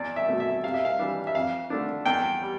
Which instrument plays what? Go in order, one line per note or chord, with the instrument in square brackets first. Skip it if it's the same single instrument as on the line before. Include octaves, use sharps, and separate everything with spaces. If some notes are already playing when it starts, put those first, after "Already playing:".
Already playing: [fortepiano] E2 D5
E5
B2 A3
E5
C3 F5
E5
F5
E3 G3 D4
E5
F2 F5
D3 A3 D4
E2 G5
G3